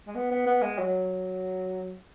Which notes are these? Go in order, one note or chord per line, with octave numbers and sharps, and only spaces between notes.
G#3
B3
B3
B3
G#3
F#3